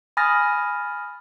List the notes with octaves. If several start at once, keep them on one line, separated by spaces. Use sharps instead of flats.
G#5 B5 D#6 F6 A6 A#6